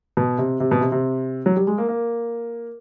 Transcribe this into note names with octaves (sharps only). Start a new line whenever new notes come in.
B2
C3
C3
B2
C3
C3
F#3
G3
G#3
A#3
A#3